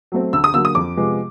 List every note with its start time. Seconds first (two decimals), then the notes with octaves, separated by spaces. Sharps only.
0.12 F#3 A3 C4
0.33 D2 E6
0.44 D#6
0.54 D3 F#3 A#3 E6
0.65 D#6
0.75 F2 D6
0.97 C3 F3 G#3 B3